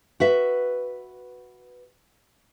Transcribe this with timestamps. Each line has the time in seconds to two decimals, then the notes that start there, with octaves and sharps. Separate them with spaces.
0.20 F#4 B4 E5